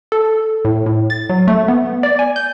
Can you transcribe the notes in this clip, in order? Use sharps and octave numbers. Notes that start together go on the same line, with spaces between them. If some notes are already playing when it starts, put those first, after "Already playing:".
A4
A2
A2
A6
F#3
A3
B3
D5
G#5
G6